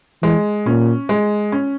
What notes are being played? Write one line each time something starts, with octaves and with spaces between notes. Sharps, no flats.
E3 G#3
A#2 C#4
G#3
C#4